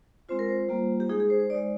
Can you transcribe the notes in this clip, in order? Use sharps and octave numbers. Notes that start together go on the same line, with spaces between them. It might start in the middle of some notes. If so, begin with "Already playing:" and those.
G#3 C4 F4 C5
A#4
C5
G3 A#3 F4
G4
G#3 D#4 G#4
G#4
C5
C5
G#3 D#4 D5